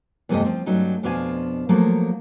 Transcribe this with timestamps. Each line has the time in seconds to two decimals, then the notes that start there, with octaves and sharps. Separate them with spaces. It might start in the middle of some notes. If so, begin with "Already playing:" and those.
0.29 E2 G2 C3 A3 C4 D#5
0.44 F3 C4
0.66 G2 F#3 A3 C#4 D#4
1.03 F2 B2 D4 F4 F5 G#5
1.69 F3 F#3 A3 A#3